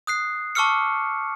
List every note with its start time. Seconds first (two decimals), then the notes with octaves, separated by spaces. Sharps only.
0.07 D#6 F#6 C7
0.55 A5 C#6 D6 E6 F6 C#7